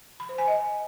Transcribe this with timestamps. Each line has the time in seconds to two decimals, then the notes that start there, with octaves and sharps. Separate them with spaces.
0.20 B5
0.29 C5
0.38 G#5
0.48 D#5